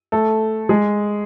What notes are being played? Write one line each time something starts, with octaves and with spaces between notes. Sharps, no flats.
A3 A4
G#3 G#4